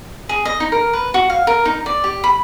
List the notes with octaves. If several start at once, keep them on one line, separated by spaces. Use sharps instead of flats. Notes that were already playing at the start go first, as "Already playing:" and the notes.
G#4
D#5
D#4
A#4
B4
F#4
F5
A#4
D#4
D5
G4
B5